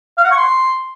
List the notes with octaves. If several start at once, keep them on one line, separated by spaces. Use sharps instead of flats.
F5
F#5
C#6
C6